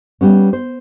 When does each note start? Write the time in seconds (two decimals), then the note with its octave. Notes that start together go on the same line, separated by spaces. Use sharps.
0.21 G3 B3 C#4
0.53 C5